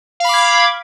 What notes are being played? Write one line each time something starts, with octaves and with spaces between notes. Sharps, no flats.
F5 B5 D6 G#6